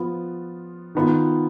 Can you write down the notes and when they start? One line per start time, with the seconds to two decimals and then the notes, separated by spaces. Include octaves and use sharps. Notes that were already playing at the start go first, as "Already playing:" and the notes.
Already playing: F3 B3 F4
0.95 D#3 B3 F4